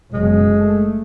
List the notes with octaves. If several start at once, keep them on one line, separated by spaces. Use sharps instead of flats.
F#1 B2 G#3
A3